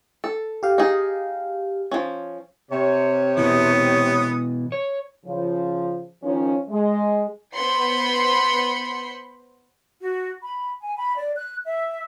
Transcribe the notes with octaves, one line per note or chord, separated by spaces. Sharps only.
A4
G4 F5
D#4 G#4
F3 C#4
C3 C#5
B2 E3 B3 D#6
C#5
C#3 F3
D#3 F3 C#4
G#3
B3 C5 B5 C6 C#7
F#4
B5
G#5
B5
D5
F#6
E5